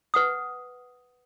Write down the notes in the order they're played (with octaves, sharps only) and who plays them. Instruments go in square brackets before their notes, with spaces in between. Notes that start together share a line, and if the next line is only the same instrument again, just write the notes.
[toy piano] B4 F#5 D#6